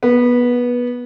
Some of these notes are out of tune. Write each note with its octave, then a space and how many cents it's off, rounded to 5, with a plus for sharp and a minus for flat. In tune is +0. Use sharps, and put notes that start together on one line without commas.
B3 -15